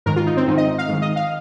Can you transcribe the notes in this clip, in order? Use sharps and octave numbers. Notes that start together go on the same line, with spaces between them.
G#2 D#3 A#4
F4
D#4
C4
G#2 D#3 D#4
D#5
F5
G#2 D#3
D#5
F5